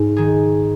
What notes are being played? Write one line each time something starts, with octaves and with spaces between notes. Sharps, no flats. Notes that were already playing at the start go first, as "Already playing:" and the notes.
Already playing: G#2
D#3 G#4